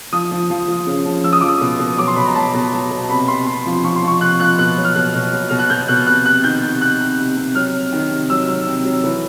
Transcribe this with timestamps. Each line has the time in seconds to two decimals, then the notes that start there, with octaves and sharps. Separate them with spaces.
0.12 F3 D#6
0.31 F3
0.50 F3
0.68 F3
0.87 C#3
1.05 F3
1.24 F3 E6
1.33 D#6
1.41 F3 D6
1.49 D#6
1.61 B2
1.80 B2
1.98 F#3 D6
2.08 C6
2.16 B2 B5
2.26 A#5
2.35 F#3 A5
2.54 B2
2.73 F#3
2.91 B2
3.10 C3 B5
3.28 C3 C6
3.46 C3 C6
3.66 F3
3.84 F3 C#6
3.96 C6
4.02 F3
4.07 C#6
4.21 C3 F#6
4.40 F3 F#6
4.59 B2 F#6
4.77 F#3
4.84 F6
4.95 B2 F#6
5.15 B2
5.32 F#3
5.49 B2 F6
5.59 F#6
5.70 B2 G6
5.88 B2 F#6
6.07 C3 F#6
6.25 C3 F#6
6.44 D#3 G6
6.63 C3
6.81 C3 F#6
7.00 C3
7.18 C3
7.37 C3
7.55 F#3 F6
7.74 C3
7.93 D#3
8.11 C3
8.30 F#3 E6
8.48 F#3 E6
8.67 C3
8.85 F#3
9.04 E3